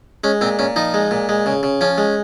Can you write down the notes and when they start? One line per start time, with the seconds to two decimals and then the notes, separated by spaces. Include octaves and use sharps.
0.24 G#3 C#4
0.41 A#2 C4
0.59 A#2 C#4
0.76 F3 D#4
0.94 G#3
1.11 A#2
1.29 G#3
1.46 C#3
1.63 C#3
1.81 F3 C#4
1.98 G#3